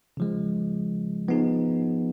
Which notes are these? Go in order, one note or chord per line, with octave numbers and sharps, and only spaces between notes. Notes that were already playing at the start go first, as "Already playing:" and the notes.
C#3 F3 G#3
F3 B3 D#4 G#4